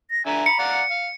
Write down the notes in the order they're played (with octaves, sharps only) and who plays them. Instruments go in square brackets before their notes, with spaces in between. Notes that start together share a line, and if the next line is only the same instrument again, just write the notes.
[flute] A#6
[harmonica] D3 E5 G#5 [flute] A#5
[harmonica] B5 [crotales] C#7
[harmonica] D5 F5 F#5
F5